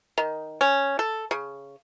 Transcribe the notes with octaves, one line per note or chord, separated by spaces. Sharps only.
D#3
C#4
A4
C#3